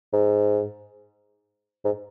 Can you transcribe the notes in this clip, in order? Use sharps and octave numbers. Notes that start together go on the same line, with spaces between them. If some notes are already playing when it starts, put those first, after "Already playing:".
G#2
G#2